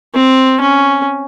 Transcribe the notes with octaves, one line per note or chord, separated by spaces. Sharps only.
C4
C#4